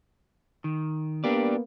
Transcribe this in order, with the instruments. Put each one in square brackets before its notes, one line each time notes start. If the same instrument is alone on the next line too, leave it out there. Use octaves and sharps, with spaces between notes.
[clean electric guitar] D#3
[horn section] A#3 B3 [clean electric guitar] D4 G4 D5